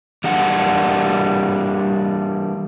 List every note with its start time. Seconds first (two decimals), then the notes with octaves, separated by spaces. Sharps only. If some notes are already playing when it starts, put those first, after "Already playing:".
0.24 E3 G3 A#3 D4 F#5